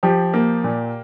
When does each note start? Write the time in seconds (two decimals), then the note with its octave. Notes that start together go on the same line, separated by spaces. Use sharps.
0.03 F3 G4
0.34 A#3
0.64 A#2